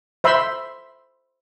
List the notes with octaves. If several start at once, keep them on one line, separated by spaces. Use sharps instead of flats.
C5 E5 B5 C6 E6